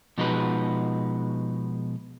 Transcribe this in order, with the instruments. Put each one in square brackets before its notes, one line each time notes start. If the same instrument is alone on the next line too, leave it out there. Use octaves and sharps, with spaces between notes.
[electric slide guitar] B2 F3 G#3 D#4 F#4 B4